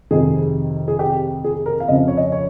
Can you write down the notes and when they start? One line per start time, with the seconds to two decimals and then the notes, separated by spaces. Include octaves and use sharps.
0.11 F2 C3 D#3 G#4
0.88 G#4
0.99 G4
1.44 G#4
1.66 A#4
1.80 F5
1.88 F2 C#3 F3 D#5
2.08 C#5
2.17 D#5
2.32 C#5